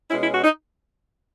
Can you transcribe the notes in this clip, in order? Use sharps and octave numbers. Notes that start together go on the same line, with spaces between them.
B2 G#3 C#4 E4
E4
F#4
D#4